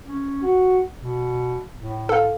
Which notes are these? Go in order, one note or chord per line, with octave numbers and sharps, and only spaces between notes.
C#4
F#4
B2
A2
A2 A4 F5